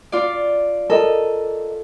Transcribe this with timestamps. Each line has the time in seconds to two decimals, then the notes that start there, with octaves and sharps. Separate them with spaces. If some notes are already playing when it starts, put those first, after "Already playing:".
0.12 F4 D5
0.90 A4 A#4 D#5